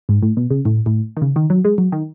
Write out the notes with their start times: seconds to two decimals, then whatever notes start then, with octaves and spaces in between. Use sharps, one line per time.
0.09 G#2
0.22 A2
0.37 B2
0.51 C#3
0.65 A2
0.86 A2
1.17 D#3
1.22 C#3
1.36 D#3
1.50 F#3
1.65 G#3
1.78 F#3
1.92 D#3